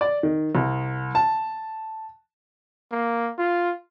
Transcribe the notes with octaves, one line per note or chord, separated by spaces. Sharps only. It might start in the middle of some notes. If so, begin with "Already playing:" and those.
D5
D#3
C2
A5
A#3
F4